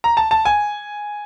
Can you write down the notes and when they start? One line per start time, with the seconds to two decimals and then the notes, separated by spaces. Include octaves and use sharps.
0.04 A#5
0.17 A5
0.31 A5
0.45 G#5